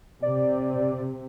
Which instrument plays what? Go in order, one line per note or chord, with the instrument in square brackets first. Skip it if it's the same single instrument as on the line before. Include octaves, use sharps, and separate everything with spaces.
[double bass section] C3 [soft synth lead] D5